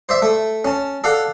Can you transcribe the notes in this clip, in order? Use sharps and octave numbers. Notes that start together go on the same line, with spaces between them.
C5 D5 E5
A3
C#4 A5
A4 D5 F5 F#5